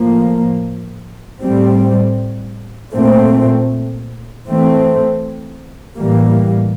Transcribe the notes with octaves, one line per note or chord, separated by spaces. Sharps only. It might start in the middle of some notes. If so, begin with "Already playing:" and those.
Already playing: A2 F3 A#3
A2 G3 C4
A#2 A3 C4
E3 A3 C4
A2 E3 G3 A#3